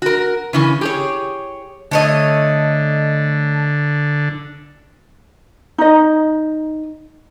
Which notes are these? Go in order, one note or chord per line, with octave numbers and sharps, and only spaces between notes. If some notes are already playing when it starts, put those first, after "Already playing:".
F#4 A#4
C#3 E3 C#4
G4 G#4 C#5
D3 A3 C#5 D#5
D#4 D#5